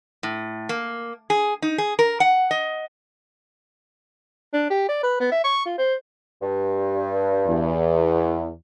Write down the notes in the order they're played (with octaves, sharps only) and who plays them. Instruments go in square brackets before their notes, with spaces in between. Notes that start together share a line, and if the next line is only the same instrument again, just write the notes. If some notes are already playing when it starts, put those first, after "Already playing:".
[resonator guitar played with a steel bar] A2
A#3
G#4
D#4
G#4
A#4
F#5
D#5
[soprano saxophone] D4
G4
D5
B4
B3
E5
C#6
F4
C5
[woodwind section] G2
[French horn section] E2